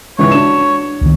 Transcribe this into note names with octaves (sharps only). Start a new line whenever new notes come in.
C#2 G#2 E3 C#5
D4 F#4 E7
C#2 D#3